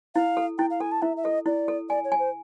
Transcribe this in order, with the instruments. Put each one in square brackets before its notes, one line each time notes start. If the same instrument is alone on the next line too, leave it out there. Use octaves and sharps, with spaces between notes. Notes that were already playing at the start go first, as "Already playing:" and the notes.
[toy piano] E4 [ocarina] F5
[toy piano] A4
[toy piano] E4 [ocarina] G5
[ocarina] F5
[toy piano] A4 [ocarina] G#5
[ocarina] A5
[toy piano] E4 [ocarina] E5
[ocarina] E5
[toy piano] A4 [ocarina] D#5
[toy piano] E4 [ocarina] D5
[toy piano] A4
[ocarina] D5 [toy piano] G#5
[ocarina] C#5
[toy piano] G#5
[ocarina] C5